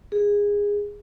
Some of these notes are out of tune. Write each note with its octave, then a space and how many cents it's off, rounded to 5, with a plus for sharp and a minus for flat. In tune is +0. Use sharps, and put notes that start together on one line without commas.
G#4 -20